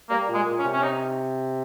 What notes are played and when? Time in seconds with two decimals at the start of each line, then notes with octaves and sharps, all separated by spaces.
0.09 G3 A#3
0.28 A#2
0.34 G#3
0.46 A#2
0.58 C#4
0.64 C3
0.73 C#4
0.83 D#4